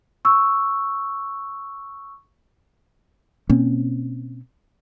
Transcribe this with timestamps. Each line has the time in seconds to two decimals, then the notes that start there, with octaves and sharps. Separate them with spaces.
0.25 C#6 E6
3.49 B2 A#3 C4 C#4